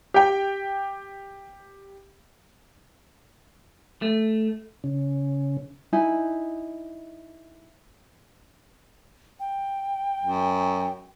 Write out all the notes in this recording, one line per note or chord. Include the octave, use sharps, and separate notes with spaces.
G4 G5
A3
C#3
D#4 E4 G#5
G5
F#2